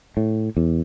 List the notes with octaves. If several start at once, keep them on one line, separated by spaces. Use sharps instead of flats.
A2
E2